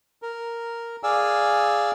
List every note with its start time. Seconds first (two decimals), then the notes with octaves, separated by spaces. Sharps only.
0.22 A#4
1.03 G#4 D5 F5 G#5 E6